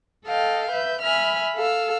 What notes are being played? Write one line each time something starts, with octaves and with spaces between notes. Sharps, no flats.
A4 D#5 F5 G5
B4 E5 G6
E5 G#5 B5 F6
A4 F5 E6